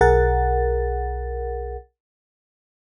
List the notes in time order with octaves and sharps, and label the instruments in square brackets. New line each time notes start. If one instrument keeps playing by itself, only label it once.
[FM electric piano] B1 G#4 A#4 F#5 A6